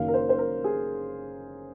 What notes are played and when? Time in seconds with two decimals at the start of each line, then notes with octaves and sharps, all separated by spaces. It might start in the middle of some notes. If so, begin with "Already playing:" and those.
Already playing: F#1 F#2 D#3 A#3 F5
0.08 A#4
0.14 C5
0.29 C5
0.38 A#4
0.64 G#4